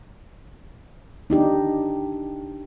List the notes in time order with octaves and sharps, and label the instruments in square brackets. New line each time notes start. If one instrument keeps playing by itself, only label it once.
[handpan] D4 D#4 G4